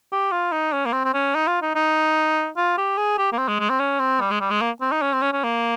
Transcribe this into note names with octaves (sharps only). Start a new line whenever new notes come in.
G4
F4
D#4
C#4
A#3
C4
C4
C#4
D#4
F4
D#4
D#4
F4
G4
G#4
G4
A#3
C4
G#3
G#3
C4
C#4
C4
G3
G#3
G3
G#3
A#3
C4
D#4
C#4
C4
C#4
C#4
A#3